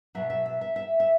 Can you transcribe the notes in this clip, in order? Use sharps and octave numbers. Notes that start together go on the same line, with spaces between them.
B2 F#3 E5
E5
E5
E5
E5
E5